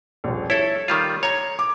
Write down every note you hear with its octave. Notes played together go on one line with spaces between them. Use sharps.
D#1 A#1
E4 A4 C#5
D#3 G3 F4
C#5 A#5 G#6
D6